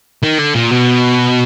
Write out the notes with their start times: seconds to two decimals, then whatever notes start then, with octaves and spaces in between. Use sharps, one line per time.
0.24 D#3
0.39 D3
0.55 A#2
0.71 B2